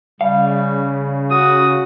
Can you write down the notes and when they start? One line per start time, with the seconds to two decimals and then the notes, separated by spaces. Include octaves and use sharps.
0.21 C#3 G3 F5
1.31 F#4 D#6